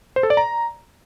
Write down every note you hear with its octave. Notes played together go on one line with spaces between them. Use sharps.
C5
A4
D5
A#5